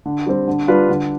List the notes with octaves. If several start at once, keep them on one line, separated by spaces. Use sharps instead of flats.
D3
G3 C4
D3
G3 D4 F4 B4
D3